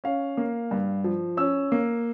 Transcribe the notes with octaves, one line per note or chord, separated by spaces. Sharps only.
C#4 F5
A#3
G2
F3
C#4 E6
A#3